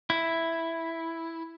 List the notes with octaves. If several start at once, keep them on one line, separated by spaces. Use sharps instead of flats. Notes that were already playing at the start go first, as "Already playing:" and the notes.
E4